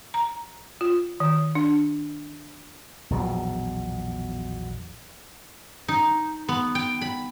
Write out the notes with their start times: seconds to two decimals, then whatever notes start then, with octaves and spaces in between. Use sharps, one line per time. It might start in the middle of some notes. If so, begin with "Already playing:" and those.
0.14 A#5
0.81 F4
1.20 D#3
1.55 D4
3.10 A#1 E2 B2 F#3
5.88 D#4
6.49 B3
6.75 G5
7.01 B5